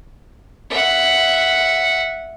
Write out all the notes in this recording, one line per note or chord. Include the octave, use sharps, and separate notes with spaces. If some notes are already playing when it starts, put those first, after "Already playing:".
E5 F#5